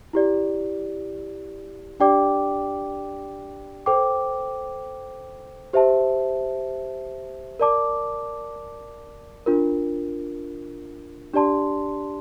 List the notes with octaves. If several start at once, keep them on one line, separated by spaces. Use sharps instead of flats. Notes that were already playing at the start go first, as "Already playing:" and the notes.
E4 G4 D5
D4 G4 D5 G5 D6
A4 C5 G5 D6
G4 C5 E5 A5
A#4 D5 A5 D6
D4 F4 A#4
D4 G4 D5 A5 C6